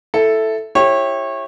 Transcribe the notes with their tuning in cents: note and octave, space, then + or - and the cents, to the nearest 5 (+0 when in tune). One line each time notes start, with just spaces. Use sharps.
E4 +0 A4 +0 A5 +0
E4 +0 G4 +0 C#5 -25